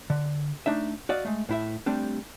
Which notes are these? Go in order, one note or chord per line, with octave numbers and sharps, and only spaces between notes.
D3
A3 D4 D#4 E5
F#4 D5 D#5 F5
G#3 A3
A2 E4 E5
G3 A3 C4 D4